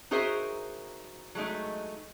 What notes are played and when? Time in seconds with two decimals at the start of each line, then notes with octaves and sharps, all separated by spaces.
0.11 D#4 F#4 G#4 A#4 C5 E5
1.35 F#3 G#3 A3 D#4